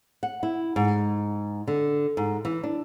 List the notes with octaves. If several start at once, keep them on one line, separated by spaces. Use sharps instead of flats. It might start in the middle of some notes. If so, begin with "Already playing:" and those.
F#5
E4
G#2
D3
G#2
E3
D4